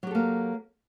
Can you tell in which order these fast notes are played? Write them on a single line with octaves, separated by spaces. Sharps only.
F#3 G4 A4 A#3